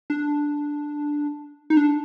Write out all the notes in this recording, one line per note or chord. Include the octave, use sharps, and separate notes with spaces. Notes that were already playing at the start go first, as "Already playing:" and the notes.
D4
D#4
D4